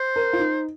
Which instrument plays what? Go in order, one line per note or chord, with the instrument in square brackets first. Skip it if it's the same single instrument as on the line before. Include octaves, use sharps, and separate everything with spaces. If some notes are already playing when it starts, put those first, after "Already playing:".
Already playing: [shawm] C5
[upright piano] A#4
F4
D#4